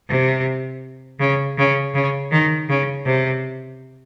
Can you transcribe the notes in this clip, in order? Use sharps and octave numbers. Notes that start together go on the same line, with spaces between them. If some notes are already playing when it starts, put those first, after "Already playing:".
C3
C#3
C#3
C#3
D#3
C#3
C3